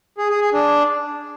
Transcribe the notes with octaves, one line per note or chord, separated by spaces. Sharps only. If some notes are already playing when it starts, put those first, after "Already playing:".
G#4
G#4
G#4
D4